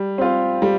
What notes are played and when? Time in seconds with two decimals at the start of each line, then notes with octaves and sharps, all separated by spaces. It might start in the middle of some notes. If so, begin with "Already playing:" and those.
Already playing: G3
0.18 C4 F4
0.62 G3